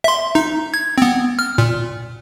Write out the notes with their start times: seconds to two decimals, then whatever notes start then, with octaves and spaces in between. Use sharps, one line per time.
0.04 E5 C6
0.35 D#4
0.74 G#6
0.98 B3 C4
1.39 F6
1.58 A#2